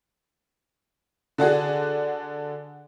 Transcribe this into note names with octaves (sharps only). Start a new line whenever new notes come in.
D3 D4 F#4 G#4